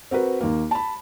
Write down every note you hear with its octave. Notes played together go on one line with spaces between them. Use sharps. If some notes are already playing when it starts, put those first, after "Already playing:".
C4 F#4 A#4 B4
D#2 A#3
A5 B5